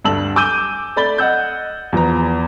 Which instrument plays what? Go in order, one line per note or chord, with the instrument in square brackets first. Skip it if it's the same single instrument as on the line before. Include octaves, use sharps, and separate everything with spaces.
[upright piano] D2 G2 A5 E6 F#7
G#5 D6 E6 G6 D#7 G7
A3 D5 B5 A6 G7
D#5 F#5 E6 G6
E2 F3 B3 A#5